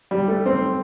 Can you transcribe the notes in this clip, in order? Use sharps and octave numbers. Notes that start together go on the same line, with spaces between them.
G3
A3
C4